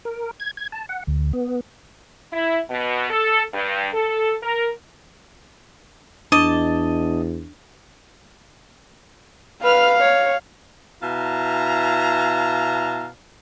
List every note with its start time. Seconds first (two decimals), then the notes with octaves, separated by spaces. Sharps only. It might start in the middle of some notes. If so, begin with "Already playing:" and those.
0.05 A#4
0.40 G#6
0.57 G#6
0.72 A5
0.89 F#5
1.07 D2
1.33 B3
2.33 E4
2.70 B2
3.10 A4
3.53 G2
3.93 A4
4.42 A#4
6.32 E2 D4 D#5 A5
9.64 B4 F5 F6
10.00 C#5
11.03 B2 E4 F5 A5 A#5